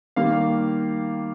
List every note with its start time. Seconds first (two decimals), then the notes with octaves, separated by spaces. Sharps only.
0.16 D#3 G3 A#3 F5